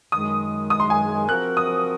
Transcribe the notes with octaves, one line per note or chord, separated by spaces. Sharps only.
F#2 D#3 G#3 D#6
D#6
C6
G#5
F3 C4 F#4 A#4 F#6
D#6